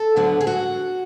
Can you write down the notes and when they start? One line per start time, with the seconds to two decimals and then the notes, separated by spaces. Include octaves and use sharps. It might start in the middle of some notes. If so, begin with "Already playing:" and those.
Already playing: A4
0.16 D2 D3 F#3 B3
0.41 G#4
0.47 F#4